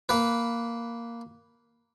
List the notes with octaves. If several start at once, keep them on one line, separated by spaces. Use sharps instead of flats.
A#3 B4